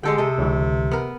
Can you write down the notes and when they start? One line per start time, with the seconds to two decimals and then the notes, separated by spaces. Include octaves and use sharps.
0.03 D3 G#3 G4 A4 G5
0.18 C3 A4 D#5
0.38 C#2 D3 E3
0.91 B3 A#4